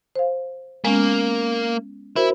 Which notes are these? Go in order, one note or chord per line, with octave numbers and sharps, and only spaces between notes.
C5 F5
G#3 A#3 B3 C#4
E4 F#4 A#4 C5